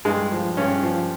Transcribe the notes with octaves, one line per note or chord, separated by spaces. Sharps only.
G2 G#3
F3
G2 C#4
F3